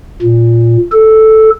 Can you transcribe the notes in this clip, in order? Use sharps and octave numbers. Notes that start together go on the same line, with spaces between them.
A#2
A4